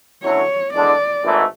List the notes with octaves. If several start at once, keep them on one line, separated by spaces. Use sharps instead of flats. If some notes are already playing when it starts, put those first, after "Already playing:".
D2 D3 F#3 C#4 E4 C#5
E2 D3 G#3 D4 D5
G#1 G#2 E3 A3